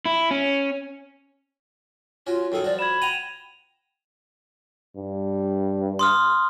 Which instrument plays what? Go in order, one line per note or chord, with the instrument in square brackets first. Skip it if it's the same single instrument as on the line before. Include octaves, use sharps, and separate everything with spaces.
[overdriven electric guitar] E4
C#4
[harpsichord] C#4 F#4 [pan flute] F4
[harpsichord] F#2 D#3 G#4 [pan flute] A4
[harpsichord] F3 F#4 [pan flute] D5
[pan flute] B5 [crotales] G#6 E7
[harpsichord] F#5 G5 A#5 [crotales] D#7 F7
[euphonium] G2
[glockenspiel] C6 D#6 F6